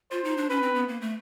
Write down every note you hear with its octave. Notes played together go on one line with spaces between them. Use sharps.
F4 C5
D#4
D4
C#4 B4
C4
B3
A#3
A3